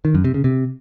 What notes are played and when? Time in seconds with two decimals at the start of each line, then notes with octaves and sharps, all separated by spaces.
0.05 D#3
0.15 F#2
0.24 C3
0.34 C#3
0.44 C3